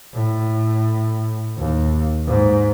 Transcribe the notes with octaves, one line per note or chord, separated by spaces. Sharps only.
A2
D#2
G#2